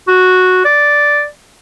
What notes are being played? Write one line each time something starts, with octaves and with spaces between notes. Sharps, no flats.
F#4
D5